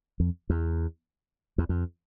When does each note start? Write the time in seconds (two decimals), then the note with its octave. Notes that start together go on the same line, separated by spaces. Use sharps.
0.20 F2
0.50 E2
1.58 E2
1.69 F2